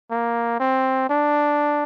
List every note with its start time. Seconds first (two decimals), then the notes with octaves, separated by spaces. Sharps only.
0.11 A#3
0.60 C4
1.10 D4